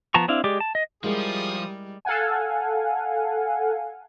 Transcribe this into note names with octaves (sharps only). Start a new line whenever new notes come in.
F3 B3 A5 A#5 C#6
C4 D4 E4 F5
G#3 G4 D5 D6
A5
D#5
F3 G3 G#3 E4 F4 G#4 A#4 D#6
A4 F5 F#5 G#5